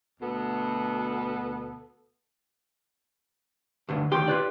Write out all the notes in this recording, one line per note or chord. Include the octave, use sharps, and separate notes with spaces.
D2 B2 B3 A4
D2 G2 D3
D2 D#3 G4 C6
F4 B4 D5